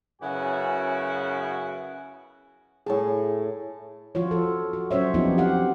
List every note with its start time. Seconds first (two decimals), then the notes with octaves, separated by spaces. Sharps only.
0.22 F#2 C#3 B3 E4 F#4 G#5
2.86 A2 G#4 C#5 G#5 A5
4.15 F3 F4 F#4 C#5
4.31 A4
4.73 F#4
4.91 F#3 C#4 C5 C#5 E5
5.14 F3 B3 C4 D#4 F4 G4
5.37 F3 G4 F5 F#5